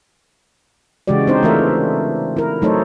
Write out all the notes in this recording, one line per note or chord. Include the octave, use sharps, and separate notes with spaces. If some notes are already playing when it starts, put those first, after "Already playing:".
C#3 E3 G#3 F#4 G4 D5
C4 D4 D#4 C5
E3 A3 F4 A#4 E5
E4 A#4
F#3 A3 D#4 A4 C5 C#5